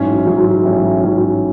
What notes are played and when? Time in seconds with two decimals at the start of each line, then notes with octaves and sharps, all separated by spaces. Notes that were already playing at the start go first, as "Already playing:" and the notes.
Already playing: A1 G#2 F#3 C#4
0.26 A1 G#2 F#3 C#4
0.63 A1 G#2 F#3 C#4
1.02 A1 G#2 F#3 C#4